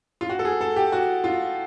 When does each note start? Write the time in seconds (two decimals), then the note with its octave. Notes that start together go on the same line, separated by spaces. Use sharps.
0.21 F4
0.29 F#4
0.39 A4
0.45 G#4
0.61 A4
0.76 G4
0.92 F#4
1.24 F4